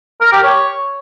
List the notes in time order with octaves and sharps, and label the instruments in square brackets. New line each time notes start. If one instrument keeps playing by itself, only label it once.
[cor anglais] A#4
G4
C#5